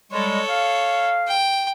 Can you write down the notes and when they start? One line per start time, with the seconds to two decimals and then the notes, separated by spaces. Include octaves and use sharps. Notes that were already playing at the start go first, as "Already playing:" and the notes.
0.12 G3 G#3 A4 C#5
0.49 F5
1.27 G5